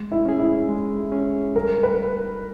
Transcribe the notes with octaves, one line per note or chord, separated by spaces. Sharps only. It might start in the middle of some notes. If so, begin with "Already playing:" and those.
Already playing: G#3
E4
C#4 G#4
E4
G#3
C#4 G#4
G3 A#4
B4